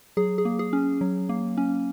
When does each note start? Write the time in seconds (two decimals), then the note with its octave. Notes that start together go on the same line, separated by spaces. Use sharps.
0.17 F#3 G#4
0.38 G#4
0.45 A#3
0.59 G#4
0.73 C#4
1.01 F#3
1.29 A#3
1.57 C#4